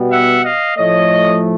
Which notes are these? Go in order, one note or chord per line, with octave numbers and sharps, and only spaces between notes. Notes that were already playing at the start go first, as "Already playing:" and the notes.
Already playing: B2 G3 B3
E5 F#5
D#5 F5
A2 F3 A3 C#5 D#5